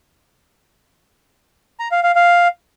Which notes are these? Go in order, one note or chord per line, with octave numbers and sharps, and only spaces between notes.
A#5
F5
F5
F5